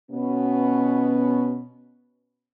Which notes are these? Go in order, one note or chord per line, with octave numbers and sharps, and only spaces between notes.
B2 B3 C#4